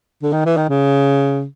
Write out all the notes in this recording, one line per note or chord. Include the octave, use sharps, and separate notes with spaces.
D3
D#3
E3
D#3
C#3